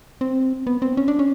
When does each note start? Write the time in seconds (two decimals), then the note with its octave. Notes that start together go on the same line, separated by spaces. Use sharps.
0.21 C4
0.67 B3
0.82 C4
0.97 C#4
1.08 D4
1.19 C#4